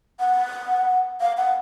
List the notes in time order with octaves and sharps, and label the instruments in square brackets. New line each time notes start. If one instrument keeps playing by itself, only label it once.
[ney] F#5
F5
F#5